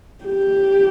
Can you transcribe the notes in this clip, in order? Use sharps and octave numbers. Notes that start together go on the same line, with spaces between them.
G4